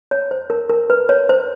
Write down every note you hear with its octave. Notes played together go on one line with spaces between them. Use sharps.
C#5
C5
A#4
A#4
B4
C#5
C5